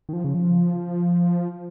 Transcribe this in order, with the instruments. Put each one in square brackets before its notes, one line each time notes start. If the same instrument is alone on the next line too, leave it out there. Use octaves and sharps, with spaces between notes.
[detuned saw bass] D#3
F3
C#3
F3